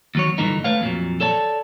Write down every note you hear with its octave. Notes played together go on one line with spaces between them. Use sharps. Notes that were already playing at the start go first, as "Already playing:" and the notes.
D#2 F#3 C#5
G2 A#2 D3 E3 D#4
A3 B4 C#5 F5
F2 A#2 F#3
A4 C#5 D5 A5